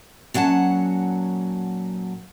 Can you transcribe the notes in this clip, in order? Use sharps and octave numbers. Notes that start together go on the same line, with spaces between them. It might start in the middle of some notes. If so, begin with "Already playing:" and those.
A#2 F#3 C#4 F#5 A5